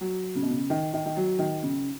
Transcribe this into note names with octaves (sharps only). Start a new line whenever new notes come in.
F#3
C#3
B2
C#3
D#3
D#3
D#3
F#3
D#3
C#3